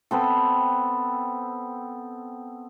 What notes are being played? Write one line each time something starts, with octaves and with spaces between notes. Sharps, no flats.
B3 C4 A4